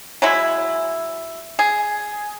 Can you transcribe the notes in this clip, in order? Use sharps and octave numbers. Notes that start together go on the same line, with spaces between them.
F#3 G#3 E4
G#4